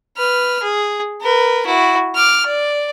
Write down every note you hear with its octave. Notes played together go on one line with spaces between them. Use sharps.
B4 F6
G#4
A#4 B4
E4 F#4
D6 F6
D5